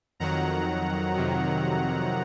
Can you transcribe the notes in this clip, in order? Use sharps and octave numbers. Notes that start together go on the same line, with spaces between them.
F2 D#3 F#3 F#5 A#5
F2 C3 D#3 F#3